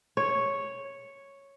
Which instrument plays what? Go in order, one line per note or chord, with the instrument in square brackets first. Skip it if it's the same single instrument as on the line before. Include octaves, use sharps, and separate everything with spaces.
[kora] C#5